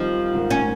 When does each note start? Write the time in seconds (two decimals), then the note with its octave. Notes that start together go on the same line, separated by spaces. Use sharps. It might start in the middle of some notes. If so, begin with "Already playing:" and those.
Already playing: D#3 F3 G3 C4 D#4
0.33 G#2 D#3 A#3
0.50 C#4